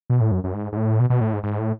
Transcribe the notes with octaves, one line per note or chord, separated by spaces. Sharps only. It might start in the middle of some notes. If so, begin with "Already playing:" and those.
B2
A2
F#2
F#2
G#2
G#2
A2
B2
B2
A2
G#2
G#2
A2